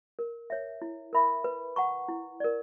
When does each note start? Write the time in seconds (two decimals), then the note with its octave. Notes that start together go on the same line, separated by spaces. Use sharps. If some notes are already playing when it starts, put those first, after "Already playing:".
0.19 A#4
0.50 C#5 E5
0.82 E4
1.13 A#4 E5 B5
1.44 B4
1.76 F#5 A#5 C#6
2.09 E4
2.40 A#4 D5